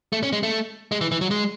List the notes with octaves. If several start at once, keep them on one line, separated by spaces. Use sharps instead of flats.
A3
C#4
G#3
A3
G#3
E3
E3
F#3
G#3